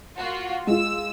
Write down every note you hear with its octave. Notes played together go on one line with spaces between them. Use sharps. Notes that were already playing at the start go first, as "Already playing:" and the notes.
A#3 F4 F#4
G#3 F4 E6